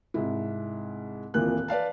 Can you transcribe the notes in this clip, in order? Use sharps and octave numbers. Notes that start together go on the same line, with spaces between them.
C2 G#2 E4
D#1 F2 A#2 E3 A#3 F#6
B4 D5 F5 A5